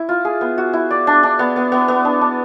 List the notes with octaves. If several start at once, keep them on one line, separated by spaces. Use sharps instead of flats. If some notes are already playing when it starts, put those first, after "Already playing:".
Already playing: E4
F4
G#4
B3
F#4
E4
D5
D4
D4
B3
B3
B3
B3
D4
D4